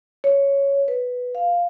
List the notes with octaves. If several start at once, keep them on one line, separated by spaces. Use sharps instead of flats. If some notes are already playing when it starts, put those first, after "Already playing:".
C#5
B4
F5